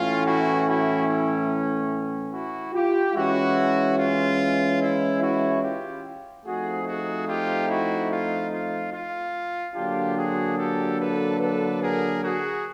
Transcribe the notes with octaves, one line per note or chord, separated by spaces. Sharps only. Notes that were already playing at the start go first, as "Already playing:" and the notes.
Already playing: A2 E3 A3 C#4 F4
E4 F#4
E4 F#4
E4
E4 F#4
F4 G4
E3 G#3 C#4 E4 F#4
F4
E4
E4 F#4
F4 G4
F3 A3 C4 D#4 F#4 G#4
F#4 G#4
F4 G4
E4 F#4
F4
F4
F4
D3 F#3 A#3 D4 F4 G4
F#4 G#4
G4 A4
A4 B4
A4 B4
G#4 A#4
F#4 G#4